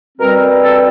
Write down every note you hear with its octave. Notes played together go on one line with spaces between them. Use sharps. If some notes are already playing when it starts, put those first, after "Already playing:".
B2 G3 C4 A#4
A4